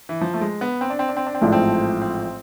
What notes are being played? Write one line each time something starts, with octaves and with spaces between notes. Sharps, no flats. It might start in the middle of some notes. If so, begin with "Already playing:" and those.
E3
F3
A3
G#3
B3
C4
D4
C4
D4
C4
D4
C4
A1 G#2 F3 A3 D4
C4
C4